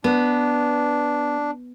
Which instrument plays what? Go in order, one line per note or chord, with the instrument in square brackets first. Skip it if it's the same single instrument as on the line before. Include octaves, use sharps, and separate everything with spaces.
[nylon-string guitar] B3 [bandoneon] D4